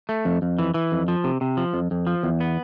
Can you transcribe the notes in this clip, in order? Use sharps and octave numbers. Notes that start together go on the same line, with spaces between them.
A3
F2
F2
E3
E3
F2
F3
C3
C3
F3
F2
F2
F3
E2
B3